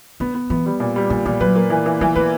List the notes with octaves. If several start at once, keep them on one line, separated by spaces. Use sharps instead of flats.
D3 B3
B3
E3 B3
G3
A#2
G3
A#2 D3
A#2 E3
F#3 B4
A#3
E3
E3
E3 G3
A#3 B4